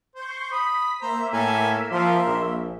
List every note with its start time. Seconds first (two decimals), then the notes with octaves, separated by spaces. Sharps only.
0.16 C5 C6 C#6 G6
0.52 B5 D#6 B6
1.02 A#3 C5 E5 A#5
1.33 A2 A4 G#5 A#5
1.92 F3 A#4 C6
2.27 A#1